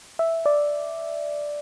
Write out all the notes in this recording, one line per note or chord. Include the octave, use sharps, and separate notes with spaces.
E5
D5